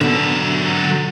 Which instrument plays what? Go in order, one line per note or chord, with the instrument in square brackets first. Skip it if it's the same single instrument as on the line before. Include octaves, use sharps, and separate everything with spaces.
[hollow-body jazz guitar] B2 D3 [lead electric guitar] F#3 E5